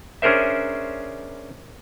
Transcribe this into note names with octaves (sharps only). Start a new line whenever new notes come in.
C#4 D4 G#4 A#4 C5 E5